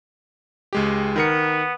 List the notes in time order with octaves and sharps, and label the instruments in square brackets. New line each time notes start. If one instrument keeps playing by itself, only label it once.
[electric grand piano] C#2 G#3 G4
[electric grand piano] D#3 A#4 C#7 [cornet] B3